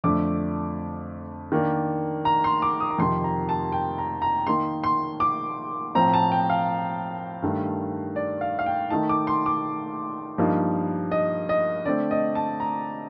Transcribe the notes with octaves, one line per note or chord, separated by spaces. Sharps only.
F2 D3 A3 D4 D6
D#3 A#3 D4
A#5
C6
D6
D#6
A#5
F2 C3 D#3 C6
A#5
A5
G5
A#5
A#5
D#3 A#3 D#4 C6
C6
D6
A2 F3 C4 A#5
A5
G5
F5
G2 D#3 A3
D5
F5
F5
G5
D#3 A3 D#4 A5
D6
C6
D6
G2 F3 A#3 D#4
D#5
D#5
D3 A3 C4 D5
D#5
A5
A#5